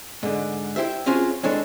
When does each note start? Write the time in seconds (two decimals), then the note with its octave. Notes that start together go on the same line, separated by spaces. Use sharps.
0.23 G#2 D3
0.76 E4 G4 C5 E5
1.06 C4 C#4 F4 F#4 G#4
1.43 E3 G#3 D4 A4 C#5